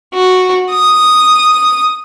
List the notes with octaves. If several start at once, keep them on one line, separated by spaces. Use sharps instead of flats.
F#4
D#6